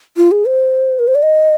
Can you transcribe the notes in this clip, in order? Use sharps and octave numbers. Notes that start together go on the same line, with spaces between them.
F4
G#4
C5
A#4
C5
D5
D#5